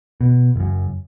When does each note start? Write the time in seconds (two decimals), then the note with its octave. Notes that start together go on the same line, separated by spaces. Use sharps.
0.21 B2
0.56 F#1 F#2